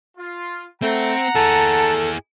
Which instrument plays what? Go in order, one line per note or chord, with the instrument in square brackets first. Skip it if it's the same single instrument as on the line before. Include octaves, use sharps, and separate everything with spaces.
[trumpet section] F4
[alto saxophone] A3 [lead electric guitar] C4 [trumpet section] F#5 A#5
[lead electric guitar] E4 G#4 [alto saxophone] A4 [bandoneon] A5